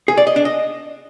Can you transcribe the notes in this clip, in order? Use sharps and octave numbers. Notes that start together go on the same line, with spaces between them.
G#4
D5
D#5
D4
D#5